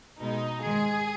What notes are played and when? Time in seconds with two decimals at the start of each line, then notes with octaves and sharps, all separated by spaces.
0.20 B2 G#3 D#4
0.62 G#2 D#3 G#3 G#4